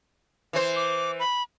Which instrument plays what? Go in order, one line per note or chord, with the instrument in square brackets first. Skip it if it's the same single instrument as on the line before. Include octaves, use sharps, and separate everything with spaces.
[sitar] E3 C5
[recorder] D6
B5